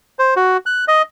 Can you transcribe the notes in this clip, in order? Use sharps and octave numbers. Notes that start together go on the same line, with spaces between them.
C5
F#4
F#6
D#5